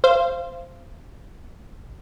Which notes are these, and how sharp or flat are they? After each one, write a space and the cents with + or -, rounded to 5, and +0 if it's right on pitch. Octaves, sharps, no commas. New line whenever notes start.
C5 +0 F5 -30